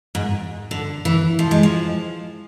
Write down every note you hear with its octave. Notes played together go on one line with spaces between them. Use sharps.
G#2
D3
E3
F3
G#3
F3